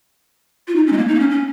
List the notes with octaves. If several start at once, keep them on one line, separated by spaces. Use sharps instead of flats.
F4
D#4
C#4
G#3
A#3
D#4
A#3
C#4
C#4